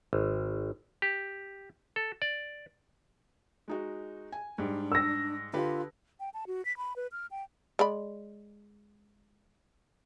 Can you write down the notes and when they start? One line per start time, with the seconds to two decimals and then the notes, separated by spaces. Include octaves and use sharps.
0.13 G#1
1.02 G4
1.96 A4
2.22 D5
3.68 G#3 D#4 F#4
4.32 G#5
4.58 G#2 G3 D4
4.92 E6 A#6
5.54 D3 F4 G4 B4
6.20 G5
6.34 A5
6.47 F#4
6.65 B6
6.77 B5
6.96 B4
7.12 F6
7.31 G5
7.79 G#3 D5 B5